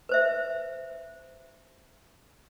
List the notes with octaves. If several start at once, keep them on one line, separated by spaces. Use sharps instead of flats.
B4 C5 E5